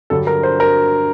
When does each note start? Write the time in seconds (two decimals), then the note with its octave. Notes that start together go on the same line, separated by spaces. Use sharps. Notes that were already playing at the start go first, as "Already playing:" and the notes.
0.10 G2 D3 F#3 A4
0.27 A#4
0.43 C5
0.60 A#4